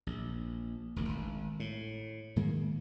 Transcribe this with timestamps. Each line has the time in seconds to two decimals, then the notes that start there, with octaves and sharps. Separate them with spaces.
0.07 A#1
0.96 E1 D2
1.09 G#1
1.60 A2
2.36 G#2 D#3 G#3 A#3